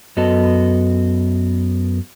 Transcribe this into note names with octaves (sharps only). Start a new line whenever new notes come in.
F#2 B3 F#4 A4 D#5 A5